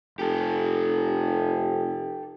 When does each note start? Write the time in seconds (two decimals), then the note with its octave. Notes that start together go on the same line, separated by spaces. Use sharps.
0.19 F1 G4 A4